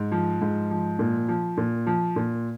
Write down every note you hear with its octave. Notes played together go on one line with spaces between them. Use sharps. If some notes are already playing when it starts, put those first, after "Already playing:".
Already playing: G#2
F3
G#2
F3
A#2
F3
A#2
F3
A#2